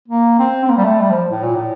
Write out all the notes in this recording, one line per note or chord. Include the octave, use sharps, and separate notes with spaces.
A#3
C4
C4
A#3
G3
A3
G3
F3
A2
A#2
A2